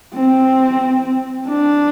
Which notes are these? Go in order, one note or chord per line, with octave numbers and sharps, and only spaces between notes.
C4
D4